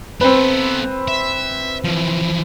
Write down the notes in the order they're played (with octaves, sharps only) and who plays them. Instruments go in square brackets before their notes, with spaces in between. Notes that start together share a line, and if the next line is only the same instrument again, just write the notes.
[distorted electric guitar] B3 A4 [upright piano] C4 B4
[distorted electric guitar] E5
E3 F3